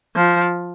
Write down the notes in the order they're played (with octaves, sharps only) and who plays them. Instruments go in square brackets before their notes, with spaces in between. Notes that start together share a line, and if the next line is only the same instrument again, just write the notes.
[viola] F3